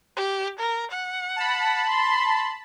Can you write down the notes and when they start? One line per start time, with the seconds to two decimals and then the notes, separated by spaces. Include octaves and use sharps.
0.16 G4
0.59 A#4
0.91 F#5
1.36 A5 B5
1.89 C6